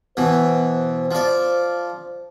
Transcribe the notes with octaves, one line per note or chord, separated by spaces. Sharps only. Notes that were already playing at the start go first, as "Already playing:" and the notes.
B2 E3 C5
F3 D5